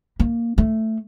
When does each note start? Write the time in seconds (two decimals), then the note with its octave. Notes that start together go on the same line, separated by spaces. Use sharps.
0.20 A#3
0.58 A3